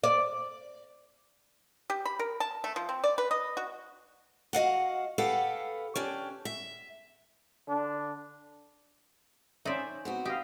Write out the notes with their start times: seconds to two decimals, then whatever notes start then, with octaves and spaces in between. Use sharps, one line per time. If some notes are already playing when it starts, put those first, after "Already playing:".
0.04 D5
1.90 G4
2.05 B5
2.19 A#4
2.40 A5
2.64 A3
2.76 F3
2.89 C4
3.04 D5
3.18 B4
3.31 D#5
3.57 F#4
4.53 F#4 D#5 F5 F#5
5.18 G4 A4 B4 F5 F#5
5.96 C#4 D4 G4
6.45 E5
7.67 D3 D4
9.65 C#4 D#4 C5 D5 E5
10.05 B3 C4 F#4
10.25 G4 D#5 F5